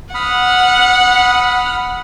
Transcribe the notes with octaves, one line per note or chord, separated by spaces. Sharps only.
F#5 B5 D#6 F6